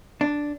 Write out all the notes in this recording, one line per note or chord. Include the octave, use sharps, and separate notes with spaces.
D4